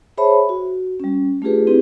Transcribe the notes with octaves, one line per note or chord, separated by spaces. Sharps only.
G#4 C5 C#5 E5 A5 B5
F#4
G3 C#4
A3 D4 F4 G4 G#4 B4
C4 D4 E4 G4 G#4 B4